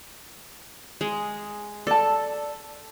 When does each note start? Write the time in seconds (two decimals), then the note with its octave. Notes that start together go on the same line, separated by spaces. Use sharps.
1.01 G#3
1.87 A4 D5 A5